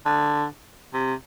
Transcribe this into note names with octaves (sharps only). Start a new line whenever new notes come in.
D3
C3